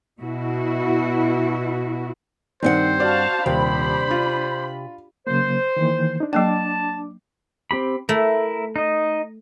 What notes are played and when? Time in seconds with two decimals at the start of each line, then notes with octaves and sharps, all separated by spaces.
0.19 B2 E4 F#4
2.63 G2 D#3 C4 C5 F#5
3.00 F#4 D5 F5 A5
3.46 D#1 C3 D4 C5 B5
4.11 F4
5.27 C#3 F#3 A#3 C5
5.77 D#3 E3 A#3
6.20 D4 D#4
6.33 F#3 A#3 D4 G5 A5 D6
7.71 C4 G4 B5
8.09 A3 E4 A#4
8.76 D#4 D#5